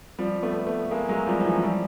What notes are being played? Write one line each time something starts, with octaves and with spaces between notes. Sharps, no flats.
F3 G3
A3 B3
A3 B3
G#3 A#3
F#3 G#3
F3 G3
F3
E3 F#3
F#3
F3 G3